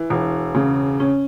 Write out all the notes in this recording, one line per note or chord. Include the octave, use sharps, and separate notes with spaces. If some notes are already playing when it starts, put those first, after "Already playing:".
Already playing: E3
E1
C#3
C#4